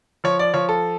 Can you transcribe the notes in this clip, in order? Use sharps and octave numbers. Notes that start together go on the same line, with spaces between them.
F3 C#5
D5
F3 C#5
A4